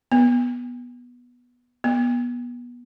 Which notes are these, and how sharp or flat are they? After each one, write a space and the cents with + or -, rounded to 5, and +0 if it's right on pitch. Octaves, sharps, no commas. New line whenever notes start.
B3 -10
B3 -25